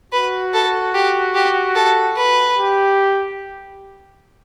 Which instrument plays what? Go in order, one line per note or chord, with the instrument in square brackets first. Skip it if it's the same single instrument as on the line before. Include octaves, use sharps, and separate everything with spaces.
[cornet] F#4 [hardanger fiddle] B4
[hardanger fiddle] A4
G4
G4
A4
B4
[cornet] G4